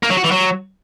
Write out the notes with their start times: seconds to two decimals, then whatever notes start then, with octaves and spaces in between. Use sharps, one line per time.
0.03 A#3
0.10 F#3
0.17 F#4
0.24 E3
0.31 F#3